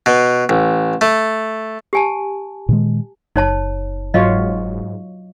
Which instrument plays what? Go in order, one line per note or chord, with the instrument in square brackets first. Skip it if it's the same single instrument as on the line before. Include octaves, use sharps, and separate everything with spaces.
[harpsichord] B2
A1
A3
[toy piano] G4 G#5 A5
[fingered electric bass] A#2 D#3 G#3
[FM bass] F#1 [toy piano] D#4 C#5 A5
[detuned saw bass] G#2 [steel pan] F#3 F4 C#5 [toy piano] D#5 F5